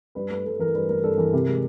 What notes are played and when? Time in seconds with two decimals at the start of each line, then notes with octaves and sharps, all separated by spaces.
0.15 G2 B4
0.30 A3 B4
0.45 G2 A4
0.59 E3 A#4
0.75 G2 B4
0.89 A3 A#4
1.04 G2 A4
1.18 E3 A#4
1.33 C3
1.48 G#3